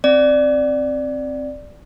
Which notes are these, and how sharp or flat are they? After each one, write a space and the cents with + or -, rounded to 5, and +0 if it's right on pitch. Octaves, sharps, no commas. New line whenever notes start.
C4 +5 D5 +5